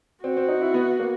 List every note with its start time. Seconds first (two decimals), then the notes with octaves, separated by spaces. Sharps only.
0.24 C4 F#4
0.37 C4
0.48 D#4
0.61 E4
0.74 B3
1.00 A#3